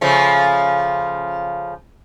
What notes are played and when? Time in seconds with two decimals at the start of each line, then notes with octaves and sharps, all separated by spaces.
0.01 C#3 F3 A3